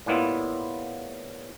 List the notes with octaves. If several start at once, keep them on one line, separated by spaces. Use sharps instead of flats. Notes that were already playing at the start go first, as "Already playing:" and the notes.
A2 G3 A#3 B3 E4 F4